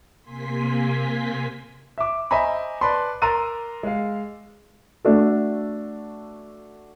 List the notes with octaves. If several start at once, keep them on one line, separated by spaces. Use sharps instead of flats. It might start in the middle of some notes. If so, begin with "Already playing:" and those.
C3 A#3 G#5 C6 B6
E5 D6
C5 D#5 E5 G#5 A#5 B5
B4 D5 A5 B5 C6
A#4 A#5 C6 E6 A6 D#7
G#3 F5
A3 D4 F#4 A4